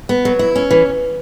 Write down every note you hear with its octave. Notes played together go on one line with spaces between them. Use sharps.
B3
F#3
E4
C#4
E3